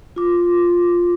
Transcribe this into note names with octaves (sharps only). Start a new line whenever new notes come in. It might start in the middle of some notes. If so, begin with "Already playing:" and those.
F4 D6